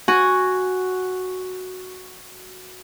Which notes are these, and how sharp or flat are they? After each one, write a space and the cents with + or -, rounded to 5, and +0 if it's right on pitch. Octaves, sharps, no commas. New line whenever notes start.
F#4 +0 G#5 +0